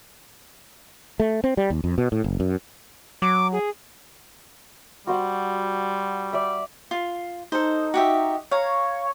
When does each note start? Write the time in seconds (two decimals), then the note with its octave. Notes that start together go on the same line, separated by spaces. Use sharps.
1.20 A3
1.44 C4
1.57 G3
1.70 D#2
1.84 F2
1.98 B2
2.12 A2
2.24 F#1
2.40 F#2
3.22 F#3 D6
3.52 G#4
5.07 G3 F#4 C5 F#5
6.33 D5 E5
6.91 F4
7.52 D#4 A4 C5
7.94 F#4 G4 E5
8.51 C#5 F5 A#5